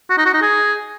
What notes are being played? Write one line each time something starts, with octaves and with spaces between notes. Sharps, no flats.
F#4
D#4
F#4
D#4
G#4